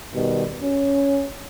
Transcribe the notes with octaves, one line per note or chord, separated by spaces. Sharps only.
B2 D#3 G3
C#4